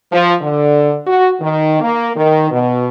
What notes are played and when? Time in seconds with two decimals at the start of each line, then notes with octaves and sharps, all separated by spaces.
0.12 F3
0.42 D3
1.07 F#4
1.40 D#3
1.81 A#3
2.16 D#3
2.51 B2